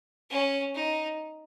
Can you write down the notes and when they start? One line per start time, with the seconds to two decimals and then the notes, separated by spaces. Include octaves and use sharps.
0.30 C#4
0.75 D#4